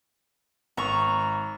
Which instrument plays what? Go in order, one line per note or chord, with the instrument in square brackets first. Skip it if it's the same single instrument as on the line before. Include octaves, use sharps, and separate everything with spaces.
[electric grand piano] G#1 [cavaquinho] A#5 C#6